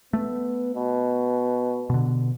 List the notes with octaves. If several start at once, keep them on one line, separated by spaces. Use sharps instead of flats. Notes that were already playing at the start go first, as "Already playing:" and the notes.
A3 B3
B2
B2 D3